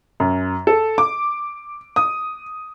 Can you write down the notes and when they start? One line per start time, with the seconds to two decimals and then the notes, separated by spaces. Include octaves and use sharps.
0.20 F#2
0.67 A4
0.98 D6
1.96 D#6